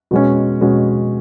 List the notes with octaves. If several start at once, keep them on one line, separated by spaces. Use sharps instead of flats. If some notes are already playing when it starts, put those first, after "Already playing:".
B2 G#3 C#4
B2 G#3 C#4